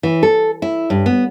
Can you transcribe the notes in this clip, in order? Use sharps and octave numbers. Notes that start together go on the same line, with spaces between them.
E3
A4
E4
G2
B3